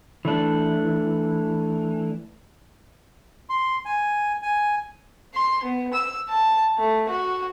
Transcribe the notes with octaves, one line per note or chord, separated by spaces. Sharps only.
E3 A3 D4
C6
G#5
G#5
C6
B3
E6
A5
A3
F#4